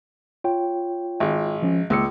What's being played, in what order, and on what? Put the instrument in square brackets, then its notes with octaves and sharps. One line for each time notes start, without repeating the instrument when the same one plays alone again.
[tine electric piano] F4 C#5 G5
[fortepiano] G#1
[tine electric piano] F3 C#4
[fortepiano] C#2 [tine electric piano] A#3 E6 C#7